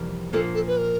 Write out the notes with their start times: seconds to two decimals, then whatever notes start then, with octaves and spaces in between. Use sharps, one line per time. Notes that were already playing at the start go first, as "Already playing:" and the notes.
Already playing: F2 C3 E3 G3 A#3
0.33 A#2 F3 A#3 A4
0.55 A4
0.67 B4
0.77 A#4